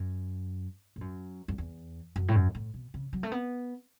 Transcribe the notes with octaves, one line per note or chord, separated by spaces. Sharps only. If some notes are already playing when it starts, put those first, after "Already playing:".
Already playing: F#2
A2
F#2
F#2
E2
F#2
A2
F#2
A2
B2
C#3
F#3
A3
B3